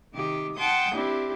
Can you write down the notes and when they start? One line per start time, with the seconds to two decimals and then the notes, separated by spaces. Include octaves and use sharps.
0.13 C3 D#3 G4
0.57 F#5 G5 A5 C6 D#6 G6
0.94 C4 D4 E4 G4